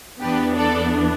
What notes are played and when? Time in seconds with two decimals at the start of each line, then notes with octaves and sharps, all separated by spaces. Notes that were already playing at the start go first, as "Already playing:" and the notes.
0.21 E2 E3 B3 D4 G4 B4
0.57 A4 D5